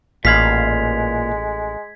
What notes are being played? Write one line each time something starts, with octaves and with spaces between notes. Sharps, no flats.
A1 A#2 G#3 F5 B5 G#6 B6